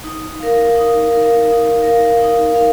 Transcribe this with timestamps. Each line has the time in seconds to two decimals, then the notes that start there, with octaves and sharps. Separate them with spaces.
0.04 D#4
0.40 A#4 F5
0.75 D#4
1.11 A#4 F5
1.47 D#4
1.83 A#4 F5
2.18 D#4
2.55 A#4 F5